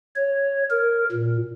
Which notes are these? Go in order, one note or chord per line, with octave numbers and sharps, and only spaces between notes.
C#5
A#4
A#2